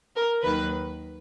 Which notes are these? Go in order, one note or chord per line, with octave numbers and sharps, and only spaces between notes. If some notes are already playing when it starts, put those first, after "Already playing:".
A#4
D#2 D#3 F#3 B4